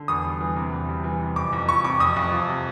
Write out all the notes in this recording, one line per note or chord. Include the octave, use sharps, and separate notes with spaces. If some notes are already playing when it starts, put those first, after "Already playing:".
Already playing: D3
E2 D#6
G3
E3
C3
E2
G3
E3
C3
F2 D6
F2
F3 C#6
C3 D6
F2 D#6
F2
F3
C3